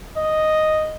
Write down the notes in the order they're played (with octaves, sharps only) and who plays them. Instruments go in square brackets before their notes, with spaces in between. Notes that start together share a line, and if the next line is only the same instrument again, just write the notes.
[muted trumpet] D#5